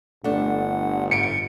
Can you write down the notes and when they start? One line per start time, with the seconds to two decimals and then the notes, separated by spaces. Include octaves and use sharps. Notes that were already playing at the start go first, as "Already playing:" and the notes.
0.24 G1 A3 D4 F#5
1.11 G#2 C#7 D7